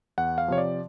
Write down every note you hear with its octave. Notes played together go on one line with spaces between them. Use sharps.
E2 F#5
F5
C3 F3 C#5
D5